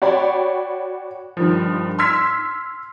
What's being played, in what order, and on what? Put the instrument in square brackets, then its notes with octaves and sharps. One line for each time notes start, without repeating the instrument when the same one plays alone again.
[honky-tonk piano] F#4 C#5 D5 G5 B5
G2 D#3 F3
C6 E6 F6 G#6 B6